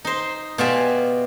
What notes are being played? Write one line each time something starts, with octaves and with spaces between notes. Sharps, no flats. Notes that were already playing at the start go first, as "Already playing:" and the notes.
D#4 C5
B2 F4 G4 D5 E5 G#5